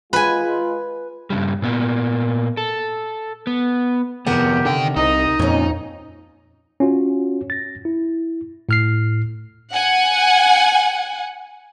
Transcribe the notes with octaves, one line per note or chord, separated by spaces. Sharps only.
G#3 F4 B4 G#5
G2 C#3 G3
A#2 A#3 B3
A4
B3
F2 C3 B3 G4 A#4 F#5
D3 D#3 G5
C2 D#4 D#5
F2 A#2 C#4
C#4 F4 F#4
A6 A#6
E4
A2 F6 C7
F#5 G#5